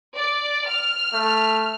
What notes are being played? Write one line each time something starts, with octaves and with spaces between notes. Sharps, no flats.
D5
F6
A3